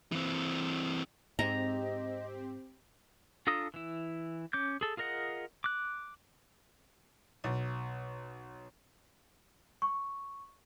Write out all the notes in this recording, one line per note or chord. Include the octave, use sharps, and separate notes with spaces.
E3 C4
G#2 C4 G4 D#5 A#5
D4 F4 A4 A#5 D#6
E3 E4
C#4 D6 G6
G#4 A4
F4 G#4 A#4 D#5 F#5
D6 F#6
B1
C#6